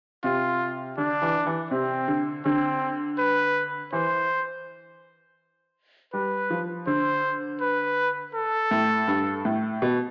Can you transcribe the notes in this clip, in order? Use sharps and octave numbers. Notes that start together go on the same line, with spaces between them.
C3 F4
D3 D4
E3
E3
C3 C4
D3
D3 C4
B4
E3 C5
G3 B4
F3
D3 C5
B4
A4
A2
G2
A2
B2